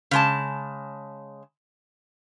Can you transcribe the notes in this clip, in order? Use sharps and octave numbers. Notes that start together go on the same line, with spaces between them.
C#3 G#3 A5